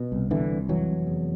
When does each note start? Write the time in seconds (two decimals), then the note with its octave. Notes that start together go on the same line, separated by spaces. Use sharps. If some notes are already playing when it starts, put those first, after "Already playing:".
Already playing: B2
0.12 C2
0.31 B2 D3 E3
0.50 C2
0.69 F1 E3 F#3
0.89 F1
1.07 E2